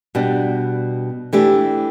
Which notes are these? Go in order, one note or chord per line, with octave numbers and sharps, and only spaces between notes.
B2 G3 D4
E3 A3 D4 G4